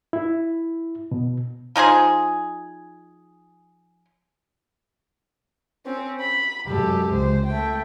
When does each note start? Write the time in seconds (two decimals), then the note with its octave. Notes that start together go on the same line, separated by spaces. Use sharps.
0.13 E4
1.11 B2
1.76 F3 D#4 G#4 C5
5.86 C4 C#4
6.21 B5
6.67 F#2 C3 G#3 G4 A4
7.13 C#2 C5
7.47 A3 G5